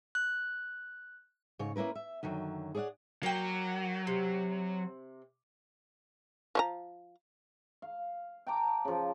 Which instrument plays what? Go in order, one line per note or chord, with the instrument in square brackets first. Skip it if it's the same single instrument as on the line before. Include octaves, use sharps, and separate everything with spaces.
[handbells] F#6
[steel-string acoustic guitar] G#2 C#3 C#5
A#3 C#4 E4 A#4 B4
E5
F#2 D3 D#3 F#3
G#4 C#5 D5 E5 F#5
[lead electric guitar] F#3 [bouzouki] A#3 G5
[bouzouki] C3
[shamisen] F3 C#5 A#5
[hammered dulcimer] F5
G5 A5 A#5 D6
C#3 F3